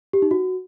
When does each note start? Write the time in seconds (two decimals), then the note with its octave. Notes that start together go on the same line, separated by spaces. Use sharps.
0.13 G4
0.22 D#4
0.31 F#4